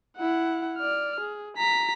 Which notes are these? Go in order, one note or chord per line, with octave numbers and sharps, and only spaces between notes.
E4 F#5
D5 F6
G#4
A#5 B6